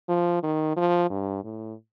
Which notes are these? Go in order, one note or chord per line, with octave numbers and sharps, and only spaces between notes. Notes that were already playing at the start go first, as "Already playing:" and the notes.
F3
D#3
F3
G2
A2